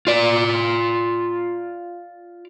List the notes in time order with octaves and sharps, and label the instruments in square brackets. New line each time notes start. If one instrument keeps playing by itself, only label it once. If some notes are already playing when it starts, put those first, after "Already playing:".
[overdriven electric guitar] F4 D5